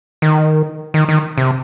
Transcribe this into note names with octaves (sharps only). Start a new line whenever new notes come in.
D#3
D#3
D#3
C3